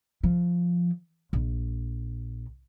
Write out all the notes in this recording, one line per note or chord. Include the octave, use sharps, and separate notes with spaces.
F3
A#1